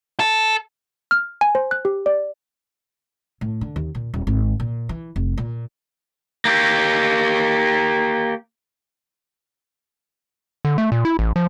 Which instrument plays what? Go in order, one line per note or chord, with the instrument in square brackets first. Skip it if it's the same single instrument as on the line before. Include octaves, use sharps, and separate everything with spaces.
[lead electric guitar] A4
[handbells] F6
G#5
C5
F#6
G4
D5
[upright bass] A2
D3
D#2
A#2
D#1
G#1
A#2
E3
F1
A#2
[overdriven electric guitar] A#3 G4
[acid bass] D3
A3
A#2
E4
A1
F3